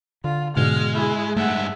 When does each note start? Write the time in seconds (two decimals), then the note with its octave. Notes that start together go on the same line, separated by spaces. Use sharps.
0.24 D3 F4
0.57 G#2 B2 D3 G#3 F6
0.94 E4 G#4
1.36 G2 G#3 A3 E5 F#5